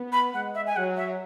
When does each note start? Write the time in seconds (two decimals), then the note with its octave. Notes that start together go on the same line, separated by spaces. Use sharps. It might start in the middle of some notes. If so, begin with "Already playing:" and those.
Already playing: B3
0.13 B5
0.34 G#3 F#5
0.55 E5
0.67 G#5
0.76 F#3 F#5
0.97 E5